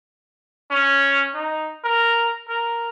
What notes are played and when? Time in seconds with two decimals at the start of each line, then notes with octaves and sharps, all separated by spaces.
0.71 C#4
1.34 D#4
1.84 A#4
2.49 A#4